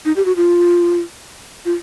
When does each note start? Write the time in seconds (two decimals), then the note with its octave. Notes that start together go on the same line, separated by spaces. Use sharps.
0.05 D#4
0.16 G4
0.25 F#4
0.36 F4
1.65 F4